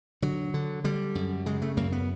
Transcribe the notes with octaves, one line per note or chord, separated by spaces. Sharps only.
D3 F#3
D3
D3 G3
F#2
C#3 G#3
A3
F#2 A#3
B3